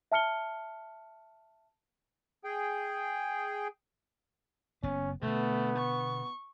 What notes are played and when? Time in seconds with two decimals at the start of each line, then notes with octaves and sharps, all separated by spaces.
0.12 E5 A5 F6 C#7 G7
2.44 G#4 G5
4.83 F#1 B3 C#4
5.22 B2 D3 A3 B3
5.78 C#6